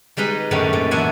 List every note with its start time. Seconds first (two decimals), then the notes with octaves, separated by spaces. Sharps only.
0.17 G3 G#3 D#4 B4
0.51 F#2 A2 D#3 G3 C#4 D4
0.73 A#2
0.91 E2 D4 E4 F#5 G#5